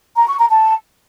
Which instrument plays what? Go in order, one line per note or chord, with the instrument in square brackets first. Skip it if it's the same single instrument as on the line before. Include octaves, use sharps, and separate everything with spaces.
[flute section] A#5
C#6
A#5
A5